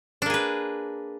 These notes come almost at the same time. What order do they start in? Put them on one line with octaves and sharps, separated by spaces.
D4 A#3 G#4 B4